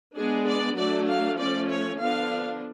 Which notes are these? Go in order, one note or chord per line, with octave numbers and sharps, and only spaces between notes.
G#3 B3 D4 G#4
D5
F#3 A3 D4 D5
F5
F3 A3 C#4 D5
C#5
D3 F3 B3 D4 F5